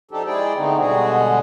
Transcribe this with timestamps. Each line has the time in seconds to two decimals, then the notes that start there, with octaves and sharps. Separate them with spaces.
0.11 F3 D4 D#4 G4 A4
0.26 G#3 E4 G#4 D5 G5
0.57 D3 A3 B3 C4 D#4
0.78 B2 D3 G3 G#3 F#4 G#4